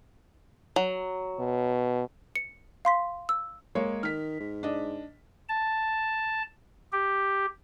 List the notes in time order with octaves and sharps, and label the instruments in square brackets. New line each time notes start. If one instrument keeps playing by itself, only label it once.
[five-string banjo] F#3
[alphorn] B2
[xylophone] C#7
F5 C6 B6
E6
[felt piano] G#3 A#3 C#5
[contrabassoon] D#3 [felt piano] F6 B6
[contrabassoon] G#2
[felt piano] D4 D#5
[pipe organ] A5
G4